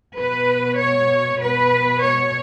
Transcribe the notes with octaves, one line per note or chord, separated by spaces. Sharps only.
B2 B4
C#5
B2 B4
C#5